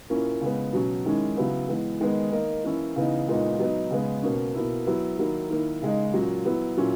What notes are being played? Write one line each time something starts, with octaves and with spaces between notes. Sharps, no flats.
A#2 A#3 C#4 E4
C#3 G#3 B3
B2 F#3 C#4
D#3 G#3 C#4 E4
C#3 F#3 B3 E4
E3 G#3 B3
D#3 G#3 B3 D#4
D#3 A#3 D#4
E3 A#3 C#4 E4
C#3 E3 B3 D#4
A#2 G#3 B3 D#4
F#3 B3 D#4
C#3 G#3 B3
B2 A#3 C#4
B2 A#3 E4
F#3 B3 E4
D#3 F#3 A#3 E4
D#3 A#3 E4
C#3 G#3 D#4
A#2 F#3 C#4
F#3 B3 E4
A#2 F#3 C#4 E4